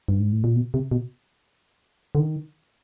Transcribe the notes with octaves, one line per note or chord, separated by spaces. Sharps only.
G2
G#2
A2
A#2
B2
C3
B2
D3
D#3